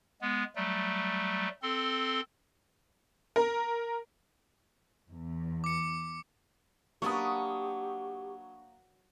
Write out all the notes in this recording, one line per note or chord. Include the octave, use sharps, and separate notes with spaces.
G#3 B3
F#3 G3 A3
C4 A4 C6
A#4
E2
D6 C#7
F#3 A#3 D4 G4 B4 C#6 D#6